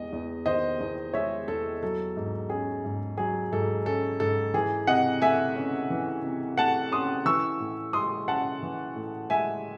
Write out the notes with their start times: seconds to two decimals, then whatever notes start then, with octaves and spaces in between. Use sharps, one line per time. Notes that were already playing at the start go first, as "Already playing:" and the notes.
Already playing: E2 G#3 D#5
0.12 E2
0.46 D#3 C5 D#5
0.80 E2
1.14 G#3 C#5 E5
1.48 E2 A4
1.83 F#3 A4
2.17 G#2
2.49 C#4 G#4
2.84 G#2
3.17 F#3 G#4
3.52 G#2 A4
3.85 C#4 A4
4.20 G#2 A4
4.54 E3 G#4
4.87 C3 D#5 F#5
5.22 A3 E5 G#5
5.56 C#4
5.90 E3
6.24 C3
6.57 A3 F#5 A5
6.92 C#4 C6 D#6
7.26 E3 C#6 E6
7.60 A2
7.93 G#3 C6 D#6
8.27 C#4 F#5 A5
8.62 E3
8.96 A2
9.30 G#3 E5 G#5